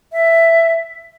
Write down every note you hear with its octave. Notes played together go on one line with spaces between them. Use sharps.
E5